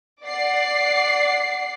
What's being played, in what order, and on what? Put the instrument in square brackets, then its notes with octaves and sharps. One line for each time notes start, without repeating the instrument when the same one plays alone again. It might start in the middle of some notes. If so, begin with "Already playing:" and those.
[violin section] D5 F#5 C7